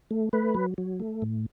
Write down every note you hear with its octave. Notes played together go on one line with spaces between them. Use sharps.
A3
A3 B4
F#3
F#3
A3
A2